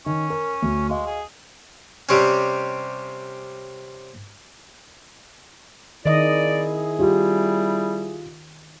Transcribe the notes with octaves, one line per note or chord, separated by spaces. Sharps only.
D#3 C#4
A#4
D2
G#3 D#5 F5 C#6
G#4
C3 G3 C4 C#4
D#3 C4 E4 G#4 D5 D#5
G3 F4 G4